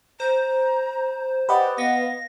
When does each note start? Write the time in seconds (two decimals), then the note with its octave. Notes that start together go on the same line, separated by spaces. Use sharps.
0.20 C5 A#5
1.49 G4 B4 D5 D#5 F#5
1.78 B3 F5 A#6